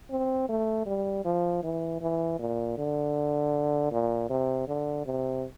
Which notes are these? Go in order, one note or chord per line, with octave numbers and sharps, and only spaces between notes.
C4
A3
G3
F3
E3
E3
A#2
D3
A#2
C3
D3
C3